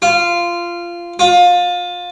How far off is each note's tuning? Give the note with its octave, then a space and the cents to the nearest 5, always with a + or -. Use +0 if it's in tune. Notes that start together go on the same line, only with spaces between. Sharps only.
F4 -15
F4 +25